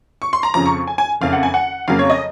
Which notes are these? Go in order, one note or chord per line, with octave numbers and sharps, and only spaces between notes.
C#6
C6
A#5
F2 C#3 F3 A#5
C#6
G#5
G#5
F#1 F2 C#3 F5
F#5
G#5
F#5
F2 C#3 F#3 A#3 F5
C#5
D#5